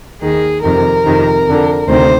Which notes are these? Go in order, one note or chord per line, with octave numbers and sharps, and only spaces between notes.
D#2 D#3 G#4
F2 C3 D#3 A#4
F2 C3 D#3
F2 D3
D2 C3 D#3 C5